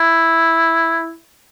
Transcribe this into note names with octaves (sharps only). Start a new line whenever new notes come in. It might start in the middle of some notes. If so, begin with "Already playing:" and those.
Already playing: E4